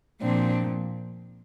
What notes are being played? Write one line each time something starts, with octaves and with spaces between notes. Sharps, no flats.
A#2 F3 C4 D4